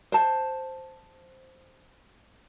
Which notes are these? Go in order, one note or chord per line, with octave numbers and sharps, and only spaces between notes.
C5 A5